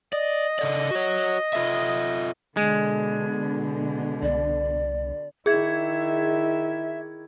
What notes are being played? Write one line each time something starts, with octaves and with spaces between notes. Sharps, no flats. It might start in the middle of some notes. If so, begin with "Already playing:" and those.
D5 D#5
C#3 A4 D5
F#4 C#5
F4 A4 E5
B2 D3 G#3
C2 D5
D#3 E4 G#4 E5 G#6